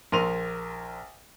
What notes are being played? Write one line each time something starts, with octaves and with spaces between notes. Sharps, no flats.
A#1 A#4 C6 D#7 F7